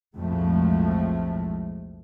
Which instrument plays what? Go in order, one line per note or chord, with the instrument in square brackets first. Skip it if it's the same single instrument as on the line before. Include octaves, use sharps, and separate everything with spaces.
[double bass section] B1 F2 A2 F3 G#3 A3